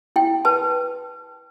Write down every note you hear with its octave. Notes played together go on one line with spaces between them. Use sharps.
E4 G5
B4 A5